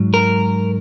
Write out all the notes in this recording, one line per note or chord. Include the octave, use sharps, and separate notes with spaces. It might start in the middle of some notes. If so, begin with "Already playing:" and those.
Already playing: G#2 F#3
A#4